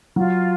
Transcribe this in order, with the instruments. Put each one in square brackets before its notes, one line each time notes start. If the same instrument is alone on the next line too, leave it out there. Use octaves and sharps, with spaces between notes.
[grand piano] F#3 [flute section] F4